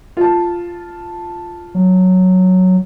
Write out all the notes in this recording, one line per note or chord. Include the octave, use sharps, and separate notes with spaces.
F4 A5
F#3